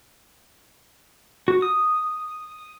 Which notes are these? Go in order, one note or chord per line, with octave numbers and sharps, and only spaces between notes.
F#4
D#6